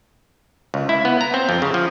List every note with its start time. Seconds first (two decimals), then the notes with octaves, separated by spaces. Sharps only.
0.74 C#2
0.89 E4
1.05 B3
1.21 A#5
1.34 C4
1.49 F2
1.62 C#3
1.74 F3